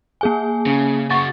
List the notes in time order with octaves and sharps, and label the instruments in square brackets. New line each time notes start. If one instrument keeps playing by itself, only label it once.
[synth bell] A#3 G#4 G#5
[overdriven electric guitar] C#3
[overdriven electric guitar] C#3 F#4 [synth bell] C#6 A6